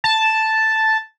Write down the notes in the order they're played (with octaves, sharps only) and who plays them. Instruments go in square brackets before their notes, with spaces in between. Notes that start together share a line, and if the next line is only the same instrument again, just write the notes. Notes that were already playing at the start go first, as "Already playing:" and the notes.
[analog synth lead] A5